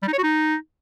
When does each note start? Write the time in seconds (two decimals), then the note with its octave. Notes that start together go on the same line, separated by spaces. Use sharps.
0.02 G3
0.08 D#4
0.13 C#5
0.18 F#4
0.23 D#4